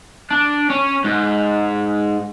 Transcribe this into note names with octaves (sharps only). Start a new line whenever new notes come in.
D4
C#4
G#2